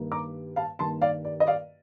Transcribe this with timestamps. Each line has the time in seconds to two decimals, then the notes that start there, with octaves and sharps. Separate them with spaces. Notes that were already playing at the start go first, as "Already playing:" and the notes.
Already playing: G2 D#3 A#3
0.12 A#5 D6
0.56 F5 A5
0.79 G2 D#3 A#3 A5 C6
1.02 D5 F5
1.25 D5
1.40 D#5
1.47 D5 F5